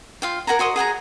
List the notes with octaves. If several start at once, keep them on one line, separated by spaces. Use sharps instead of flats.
F4 F5 G5
A#4 F#5 G#5 A#5
F#4 C5 D#5 D#6
G#4 F#5 G#5 A#5